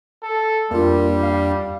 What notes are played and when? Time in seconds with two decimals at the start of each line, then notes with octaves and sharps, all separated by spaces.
0.23 A4
0.71 F2 G3 A#3 D4 F4
1.23 F5